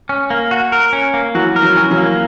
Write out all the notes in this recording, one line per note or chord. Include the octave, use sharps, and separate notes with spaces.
C#4
A#3
F#4
A#4
C#4
A#3
E3 F#3 F#4
A#4
E3 F#3
C#4
E3 F#3
A#3